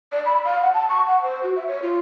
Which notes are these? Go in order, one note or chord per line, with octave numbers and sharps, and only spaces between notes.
D5
B5
F5
F#5
A5
C#6
F#5
C5
F#4
E5
C#5
F4